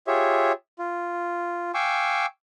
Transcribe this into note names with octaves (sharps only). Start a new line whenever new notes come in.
F4 G4 G#4 C#5 E5
F4
F5 G5 G#5 C#6 D6 E6